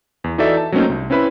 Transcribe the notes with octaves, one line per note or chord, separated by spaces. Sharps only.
E2
E3 D#4 F#4 A4 D5 E5
A5
F#3 A3 A#3 C4 C#4 D#4
C2
C4 C#4 E4 B4 E5 B5